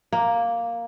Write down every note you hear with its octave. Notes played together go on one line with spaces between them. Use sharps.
A#3